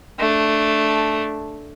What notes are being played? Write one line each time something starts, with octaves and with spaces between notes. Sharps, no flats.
A3 D4